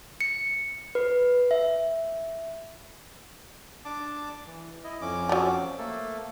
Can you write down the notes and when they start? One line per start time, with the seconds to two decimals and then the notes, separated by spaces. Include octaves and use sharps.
0.21 C#7
0.95 B4
1.51 E5
3.85 D4 A5 D6
4.47 E3
4.84 E4 D#5
5.01 F2 C#4 D6
5.29 F3 F#3
5.78 A3 A#3 A4